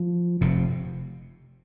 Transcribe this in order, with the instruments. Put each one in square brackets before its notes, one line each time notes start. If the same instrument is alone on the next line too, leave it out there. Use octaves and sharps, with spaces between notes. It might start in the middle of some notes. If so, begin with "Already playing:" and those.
Already playing: [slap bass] F3
F1 F2 C3